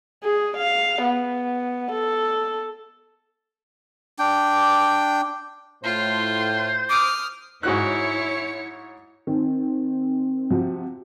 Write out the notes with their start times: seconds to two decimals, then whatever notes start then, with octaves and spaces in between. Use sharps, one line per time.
0.24 G#4
0.57 F5
1.03 B3
1.92 A4
4.19 D4 G5
5.84 A2 F4 C5
6.90 D6 D#6 F6
7.63 G#2 E4 F#4 C#5 F#6 C#7
9.27 D#3 C4
10.50 C3 F3 F#4